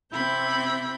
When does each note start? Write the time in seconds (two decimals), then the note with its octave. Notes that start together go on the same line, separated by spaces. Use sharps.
0.12 C3 C4 E4 B5 G6